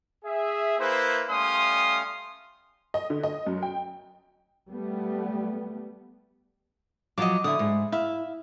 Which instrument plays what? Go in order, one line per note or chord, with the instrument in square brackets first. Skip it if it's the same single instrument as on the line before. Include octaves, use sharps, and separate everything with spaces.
[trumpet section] G#4 E5
A#3 E4 B4 C5
G3 A3 C#4 F5 C6 D#6
[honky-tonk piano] D#5
D3
D#5
F#2
G5
[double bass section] G3 A3 B3
[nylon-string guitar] F3 F#3 [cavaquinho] D#5 D6
[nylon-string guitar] D3 [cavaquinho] E4 D#6
[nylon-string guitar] G#2
[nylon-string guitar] E4 [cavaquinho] E5 F5 B5